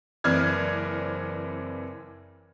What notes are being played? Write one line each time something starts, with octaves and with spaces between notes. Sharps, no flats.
F#1 E3 C4 D5 F6 G#6